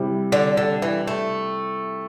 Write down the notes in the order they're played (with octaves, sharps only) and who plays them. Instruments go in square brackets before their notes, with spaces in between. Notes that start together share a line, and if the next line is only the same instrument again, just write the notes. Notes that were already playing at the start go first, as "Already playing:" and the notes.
Already playing: [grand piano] C3 G3 E4 C5
[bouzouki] D3
D3
E3
A3